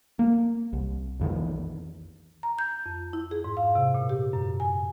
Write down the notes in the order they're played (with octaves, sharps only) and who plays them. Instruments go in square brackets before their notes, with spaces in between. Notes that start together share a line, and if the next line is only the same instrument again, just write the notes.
[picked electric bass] A#3
C2
B1 F2 D#3 E3
[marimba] A#5
G6
F2
E4
G#4
G#2
F5
C3
A#2
G4
F#2
G#5